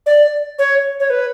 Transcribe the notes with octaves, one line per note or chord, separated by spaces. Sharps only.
D5
C#5
C#5
B4